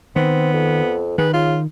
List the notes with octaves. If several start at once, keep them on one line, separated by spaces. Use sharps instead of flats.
D#3 B3 C4
F2
D#3 G#4 B4
C#3 F4